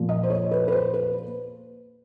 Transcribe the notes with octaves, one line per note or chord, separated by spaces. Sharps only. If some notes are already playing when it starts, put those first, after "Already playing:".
Already playing: A#2 F3
D#5
C5
C#5
B4
B4
C5
B4